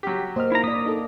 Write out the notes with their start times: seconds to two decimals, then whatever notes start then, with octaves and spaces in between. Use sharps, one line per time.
0.03 F#3 G4 B6
0.36 A#3 C5 D#5 F6
0.52 D#4 E4 A#5
0.64 A#3 D5 D#6 B6
0.86 D#4 A4